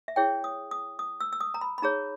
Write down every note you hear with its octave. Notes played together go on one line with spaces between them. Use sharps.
E5
E4 G#4 C#5 G5
D#6
D#6
D#6
E6
E6
D#6
A#5
B5
B5
D#4 G#4 C#5 A#5